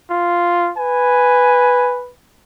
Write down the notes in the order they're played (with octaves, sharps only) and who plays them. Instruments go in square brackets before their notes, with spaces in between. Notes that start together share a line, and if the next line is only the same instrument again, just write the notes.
[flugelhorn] F4
[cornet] B4 [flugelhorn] G#5